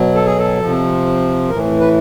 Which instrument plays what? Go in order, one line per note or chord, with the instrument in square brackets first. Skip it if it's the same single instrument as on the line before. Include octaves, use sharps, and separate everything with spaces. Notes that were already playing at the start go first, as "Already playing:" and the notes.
Already playing: [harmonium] B2 F#3
A4
G#4
A4
C3 F3
A2 E3 A#4
B4